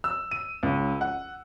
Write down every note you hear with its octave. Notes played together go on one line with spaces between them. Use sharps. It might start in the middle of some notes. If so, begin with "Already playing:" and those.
E6
D#7
C#2
F#5